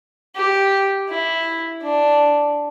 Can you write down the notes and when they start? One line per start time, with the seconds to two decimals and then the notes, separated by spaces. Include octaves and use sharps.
0.36 G4
1.09 E4
1.83 D4